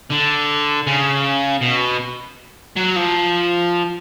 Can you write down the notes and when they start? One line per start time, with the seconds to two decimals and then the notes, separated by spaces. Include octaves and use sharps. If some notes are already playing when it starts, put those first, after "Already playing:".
0.10 D3
0.87 C#3
1.62 B2
2.77 F#3
2.96 F3